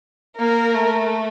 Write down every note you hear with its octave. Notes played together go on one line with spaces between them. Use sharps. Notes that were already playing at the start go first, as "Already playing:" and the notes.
A#3 A#4
A3